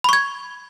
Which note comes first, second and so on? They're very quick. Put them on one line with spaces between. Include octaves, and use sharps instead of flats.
B5 C#6 G#6